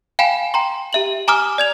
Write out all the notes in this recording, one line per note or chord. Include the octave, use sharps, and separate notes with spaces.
F5 G5 G#5 B5 E7
G5 A#5 C6
G4 E5 F#7
G#5 A#5 D6 D#6 F6
D5 G#6 F7